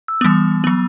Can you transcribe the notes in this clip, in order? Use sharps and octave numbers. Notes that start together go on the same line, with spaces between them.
E6
E3 G3 B3 D#6
F#3 B3